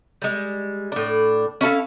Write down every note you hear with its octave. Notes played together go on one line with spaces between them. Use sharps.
G3 G#3
A2 D4
C#4 E4 A4 F5